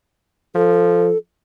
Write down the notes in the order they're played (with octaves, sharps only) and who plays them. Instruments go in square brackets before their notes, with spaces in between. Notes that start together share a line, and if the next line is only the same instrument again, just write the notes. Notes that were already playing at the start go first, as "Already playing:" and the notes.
[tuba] F3 [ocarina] A4